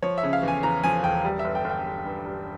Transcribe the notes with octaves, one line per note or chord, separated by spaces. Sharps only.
F3 C#5
E5
C#3
F5
E2 G#5
E2 A#5
F3 G#5
E1 G5
G3
E5
G1
G5
G1
G5
G1
G2
G3